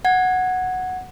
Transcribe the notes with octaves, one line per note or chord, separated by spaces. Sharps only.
F#5 G#6